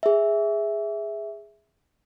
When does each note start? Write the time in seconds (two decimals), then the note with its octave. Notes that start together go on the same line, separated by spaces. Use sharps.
0.03 G#4 E5